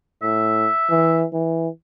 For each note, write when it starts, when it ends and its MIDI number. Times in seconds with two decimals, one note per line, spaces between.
0.22 0.69 45
0.22 1.21 76
0.90 1.25 52
1.33 1.69 52